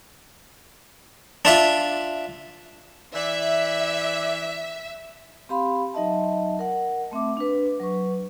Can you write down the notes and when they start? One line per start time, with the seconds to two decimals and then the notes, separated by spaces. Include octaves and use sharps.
1.45 D4 F4 E5
3.15 E3 D5 E5
5.49 C4 G4 F5 B5 C6
5.94 F#3 D#4 D#5 E5 A5
6.59 A#4 F#5
7.11 A3 C4 E5 D6
7.37 D4 B4
7.80 F#3 B4 C#6